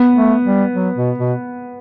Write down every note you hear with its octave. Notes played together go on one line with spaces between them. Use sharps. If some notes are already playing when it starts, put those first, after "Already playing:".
Already playing: B3
A3
G3
F#3
B2
B2